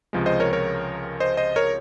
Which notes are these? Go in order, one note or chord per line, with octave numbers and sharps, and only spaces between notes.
C#2 C3 F3 G#3
C5 D#5
A#4 C#5
A#4 C#5
C5 D#5
C5 D#5
A#4 C#5